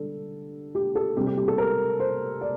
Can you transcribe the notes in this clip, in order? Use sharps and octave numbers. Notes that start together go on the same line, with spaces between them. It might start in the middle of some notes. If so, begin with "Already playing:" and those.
Already playing: D3 G3 D4 A4
G4
A4
C3 G3 C4 G4
G4
G4
A4
A#4
C5
D5